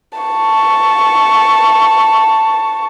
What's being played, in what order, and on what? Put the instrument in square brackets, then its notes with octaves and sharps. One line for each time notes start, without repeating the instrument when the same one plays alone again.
[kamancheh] A5 C#6